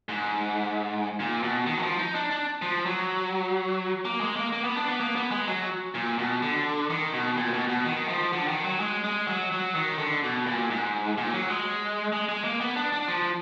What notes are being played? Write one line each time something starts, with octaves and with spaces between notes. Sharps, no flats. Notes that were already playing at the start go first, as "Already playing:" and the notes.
G#2
A#2
B2
D#3
F#3
F3
D#4
D4
D4
F3
F#3
A#3
G#3
A#3
A#3
B3
D4
B3
A#3
B3
G#3
F#3
A#2
B2
D3
D#3
B2
A#2
B2
B2
D#3
F3
D3
D#3
F#3
G#3
G#3
F#3
F#3
D#3
D3
B2
A#2
G#2
A#2
F#3
G#3
G#3
G#3
A#3
B3
D4
D4
F3